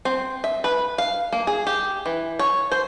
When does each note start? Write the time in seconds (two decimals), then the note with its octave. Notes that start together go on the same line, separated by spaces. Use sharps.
0.05 C4
0.44 E5
0.64 B4
0.98 F5
1.33 A#3
1.47 G#4
1.67 G4
2.06 E3
2.39 C#5
2.72 C5